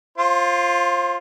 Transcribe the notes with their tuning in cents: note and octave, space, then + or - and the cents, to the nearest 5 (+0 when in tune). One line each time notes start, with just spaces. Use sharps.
F4 +0 C5 +30